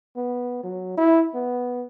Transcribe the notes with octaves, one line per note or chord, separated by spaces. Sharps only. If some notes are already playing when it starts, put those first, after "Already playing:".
B3
F#3
E4
B3